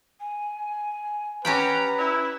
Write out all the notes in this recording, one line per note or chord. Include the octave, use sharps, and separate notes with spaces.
G#5
C#4 G4 B4 F#5 G5 A#5
E4 E6